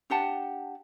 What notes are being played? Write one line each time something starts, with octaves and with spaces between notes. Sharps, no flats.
D4 G4 F#5 A5